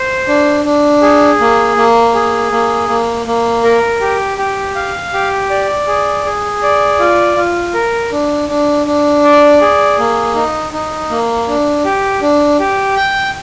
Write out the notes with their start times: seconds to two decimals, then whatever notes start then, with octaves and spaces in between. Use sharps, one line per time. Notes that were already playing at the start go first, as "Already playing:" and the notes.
Already playing: C5
0.28 D4
0.65 D4
1.02 G#4
1.40 A#3
1.77 A#3
2.14 G#4
2.52 A#3
2.89 A#3
3.26 A#3
3.64 A#4
4.01 G4
4.38 G4
4.76 F5
5.13 G4
5.50 D5
5.87 G#4
6.25 G#4
6.63 D5
6.99 F4
7.37 F4
7.74 A#4
8.12 D4
8.49 D4
8.86 D4
9.24 D5
9.61 G#4
9.99 A#3
10.35 D#4
10.73 D#4
11.10 A#3
11.48 D4
11.85 G4
12.22 D4
12.60 G4
12.96 G5